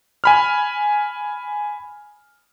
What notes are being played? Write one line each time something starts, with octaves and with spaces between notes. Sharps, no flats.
G#5 B5 F6